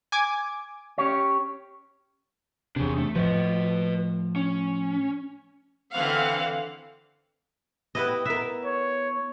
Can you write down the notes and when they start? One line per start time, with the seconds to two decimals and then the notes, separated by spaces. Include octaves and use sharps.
0.12 G#5 D6 G#6
0.98 C#4 G4 C#5
2.76 E2 C3 D4 G#4
2.98 A3
3.16 A2 F3 B4 D#5
4.36 C#4
5.93 D3 E3 C4 F5 F#5
7.95 B3 E4 G4 B4 D#5
8.25 B3 A#4 E5
8.66 C#5